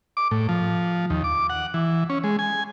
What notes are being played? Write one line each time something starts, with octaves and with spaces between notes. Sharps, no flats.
D6
A2
F3
D#2
D6
F#5
E3
C#4
G#3
G#5